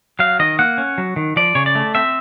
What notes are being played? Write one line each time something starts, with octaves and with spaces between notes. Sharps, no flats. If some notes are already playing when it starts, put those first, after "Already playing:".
F#3 F5
D#3 D#5
A#3 F#5
C#4
F#3
D#3
F3 D5
C#3 C#5
D5
A3
C4 E5